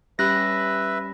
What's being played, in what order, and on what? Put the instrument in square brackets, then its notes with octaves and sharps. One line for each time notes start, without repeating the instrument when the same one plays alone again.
[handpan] G3 C#4 G4 [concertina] B4 E5 [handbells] B5 F#6 A#6